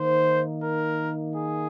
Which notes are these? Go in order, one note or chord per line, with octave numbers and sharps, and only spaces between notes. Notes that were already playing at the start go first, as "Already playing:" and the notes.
Already playing: D#3 A#3 D#4 C5
A#4
G#4